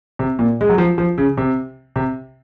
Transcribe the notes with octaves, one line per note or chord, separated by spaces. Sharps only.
C3
A#2
G#3
F#3
F3
F3
C#3
C3
C3